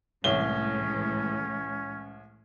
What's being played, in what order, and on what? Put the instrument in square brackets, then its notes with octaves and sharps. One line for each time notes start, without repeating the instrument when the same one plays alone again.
[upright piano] C2 C#5 G7 [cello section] A2 E3 G#3 [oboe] C#4